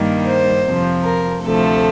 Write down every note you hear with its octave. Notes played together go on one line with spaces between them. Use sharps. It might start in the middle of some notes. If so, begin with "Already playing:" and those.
Already playing: G2 D#3 G3 A#3 D#4
C5
F2 C3 F3
A#4
D2 C3 F3 A3 A4